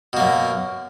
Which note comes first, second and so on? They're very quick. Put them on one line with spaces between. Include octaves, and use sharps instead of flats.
B2 A#3 F#2